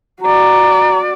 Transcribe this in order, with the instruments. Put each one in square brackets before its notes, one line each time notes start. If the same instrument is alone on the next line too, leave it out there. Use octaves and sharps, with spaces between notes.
[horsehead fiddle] F#4 D5 [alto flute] A#5